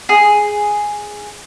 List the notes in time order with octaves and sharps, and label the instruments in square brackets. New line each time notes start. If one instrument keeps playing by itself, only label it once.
[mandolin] G#4